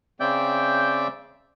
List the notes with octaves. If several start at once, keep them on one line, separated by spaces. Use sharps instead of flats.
C#3 C4 D5 E5 G5 G6